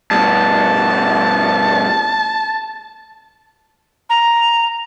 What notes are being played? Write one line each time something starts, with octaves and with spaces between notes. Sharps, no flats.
G2 B2 A5
A#5